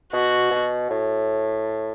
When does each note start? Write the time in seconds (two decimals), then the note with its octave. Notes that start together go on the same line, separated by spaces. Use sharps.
0.12 B2 F#4
0.51 B2
0.90 A2